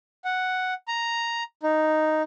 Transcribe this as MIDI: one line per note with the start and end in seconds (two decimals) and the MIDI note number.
0.25 0.74 78
0.88 1.43 82
1.63 2.22 63